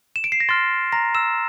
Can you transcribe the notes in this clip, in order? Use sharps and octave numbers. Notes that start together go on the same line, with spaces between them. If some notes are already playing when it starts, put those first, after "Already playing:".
E7
D7
C7
A#6
C6 F6 A6
A#5 A#6
E6 E7